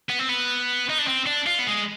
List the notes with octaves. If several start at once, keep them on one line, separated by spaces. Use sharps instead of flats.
B3
C4
B3
D#4
D4
C4
D4
F4
B3
G#3